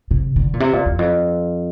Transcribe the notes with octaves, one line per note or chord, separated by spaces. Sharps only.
C3
D3
A#2
C3
A#2
E2
F2